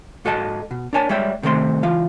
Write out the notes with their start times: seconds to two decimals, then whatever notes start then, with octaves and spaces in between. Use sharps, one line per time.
0.25 G#2 F#4 A4 D#5 A5
0.71 B2
0.93 D4 A#4 C#5 G#5 A5
1.09 G3 G#3 C#5 E5 G5
1.43 G2 C3 D#3 A3 C4 C6
1.83 C#2 E3 F4 F5